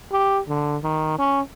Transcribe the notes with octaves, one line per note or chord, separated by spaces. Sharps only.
G4
D3
D#3
C#4